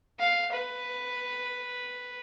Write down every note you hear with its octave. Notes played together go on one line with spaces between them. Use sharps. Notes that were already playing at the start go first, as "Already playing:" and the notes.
F5
B4